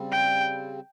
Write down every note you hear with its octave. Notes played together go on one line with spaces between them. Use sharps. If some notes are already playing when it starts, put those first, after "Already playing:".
Already playing: C#3 G3 C4
G5